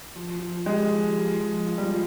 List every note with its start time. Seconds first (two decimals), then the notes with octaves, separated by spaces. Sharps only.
0.16 F3
0.40 F3
0.66 G#3 G4
0.91 F3
1.16 F4
1.41 F3
1.66 F4
1.78 G3
1.84 F3
1.92 F4